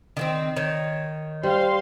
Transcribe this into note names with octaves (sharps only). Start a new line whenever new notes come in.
D#3 A#3 C4
D#3 C#5
G3 C5 F5 C6